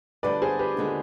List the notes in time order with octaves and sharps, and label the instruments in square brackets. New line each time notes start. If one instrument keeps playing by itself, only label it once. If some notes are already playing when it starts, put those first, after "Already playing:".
[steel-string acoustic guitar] D2 D3 G3 D4 [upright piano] B4 D5
[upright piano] G#4 C5
G4 B4
[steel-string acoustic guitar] D#2 D3 G#3